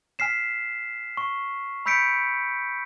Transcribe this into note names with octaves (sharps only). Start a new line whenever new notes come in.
G#5 F6 B6 C7 E7
C#6
B5 E6 G6 B6 C#7 D7